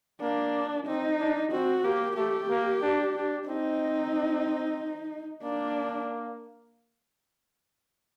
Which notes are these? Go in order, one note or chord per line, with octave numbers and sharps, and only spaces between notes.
A#3 D4
C4 D#4
D4
C4 F#4
A#3 G4
A3 G4
A#3
D4
D4
C4 D#4
A#3 D4